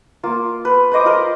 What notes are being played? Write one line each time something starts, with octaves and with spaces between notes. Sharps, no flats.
A#3 F4
B4
B4 C5 D#5 D6
F4 A#4 D#5